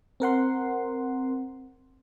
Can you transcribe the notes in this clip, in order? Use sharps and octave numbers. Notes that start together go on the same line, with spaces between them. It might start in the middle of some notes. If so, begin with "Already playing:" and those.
C4 A#4 F#5 C6